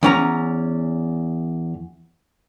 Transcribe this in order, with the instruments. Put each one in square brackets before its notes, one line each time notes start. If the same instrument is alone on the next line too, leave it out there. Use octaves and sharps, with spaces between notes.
[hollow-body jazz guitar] E2 C#4 A#5